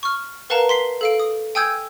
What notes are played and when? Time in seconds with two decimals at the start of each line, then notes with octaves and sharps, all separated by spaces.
0.03 C#6 F6
0.50 A#4 B4 F5 F#5 A5 A#5
0.69 C6 B6 C7
1.01 A4 F5 D7
1.20 D#6
1.55 G5 G#5 D#6 E6 G6 G#6